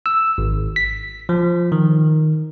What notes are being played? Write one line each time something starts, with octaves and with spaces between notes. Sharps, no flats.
E6
G#1
B6
F3
D#3